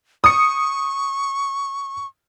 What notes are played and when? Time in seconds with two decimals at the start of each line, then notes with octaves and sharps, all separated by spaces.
0.24 C#6 D#6 C#7